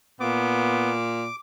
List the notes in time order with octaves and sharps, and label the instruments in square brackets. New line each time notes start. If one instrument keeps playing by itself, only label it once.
[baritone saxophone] A#2 [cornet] B3 [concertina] D6